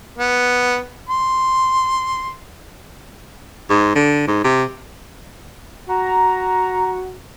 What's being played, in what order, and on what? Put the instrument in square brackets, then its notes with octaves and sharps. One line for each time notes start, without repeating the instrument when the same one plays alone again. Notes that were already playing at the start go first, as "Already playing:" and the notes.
[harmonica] B3
C6
[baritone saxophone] G#2
D3
G#2
C3
[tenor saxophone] F#4 [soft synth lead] A#5